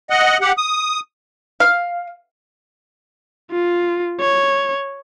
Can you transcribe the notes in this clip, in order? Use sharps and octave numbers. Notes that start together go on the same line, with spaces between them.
D#5 F#5
G4 F#5
D#6
F5
F4
C#5